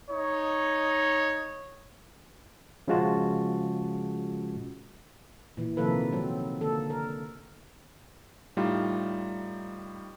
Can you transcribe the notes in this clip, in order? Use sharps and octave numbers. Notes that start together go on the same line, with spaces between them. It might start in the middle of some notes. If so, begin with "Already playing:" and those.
D#4 C#5
C#3 F3 G#3 F4 F#4 A5
A#2 E3
C3 D#3 F3 A#3 A4 B4
F#3 C4
D3 A#3 A4
A#4
A2 G3 D#4 F4